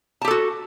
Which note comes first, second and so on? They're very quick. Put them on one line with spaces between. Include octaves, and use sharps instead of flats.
A5 G4 A4 F#4